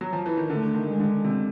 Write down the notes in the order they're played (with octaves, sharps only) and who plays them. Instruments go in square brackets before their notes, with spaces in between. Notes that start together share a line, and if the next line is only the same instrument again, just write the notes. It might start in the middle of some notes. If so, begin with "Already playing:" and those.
[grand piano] F#3
F3
E3
D#3
[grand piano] D3 [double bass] A3
[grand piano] D#3
[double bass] G#3
[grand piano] D3
C3